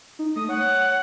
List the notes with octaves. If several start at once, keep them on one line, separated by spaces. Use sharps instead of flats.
D#4
A3 D#6
C#5 F#5